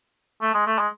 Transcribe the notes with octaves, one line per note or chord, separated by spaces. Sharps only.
A3
G#3
A3
G#3